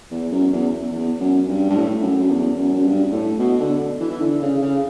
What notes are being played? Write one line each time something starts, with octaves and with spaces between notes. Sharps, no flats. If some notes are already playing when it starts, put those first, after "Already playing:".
E2
F#2
E2
E2
F#2
G2
G2
A2
F#2
F#2
E2
F#2
F#2
G2
A2
B2
D3
E3
E3
D3
C#3
C#3